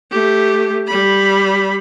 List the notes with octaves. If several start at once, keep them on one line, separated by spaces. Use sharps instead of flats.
A3 G4
G3 B5